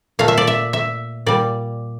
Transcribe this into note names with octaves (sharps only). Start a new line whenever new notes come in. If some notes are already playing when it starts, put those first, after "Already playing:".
A#2 A3 F5
E5
D5
E5
E5
A#2 G3 D5